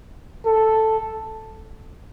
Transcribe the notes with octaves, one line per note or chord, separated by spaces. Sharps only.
A4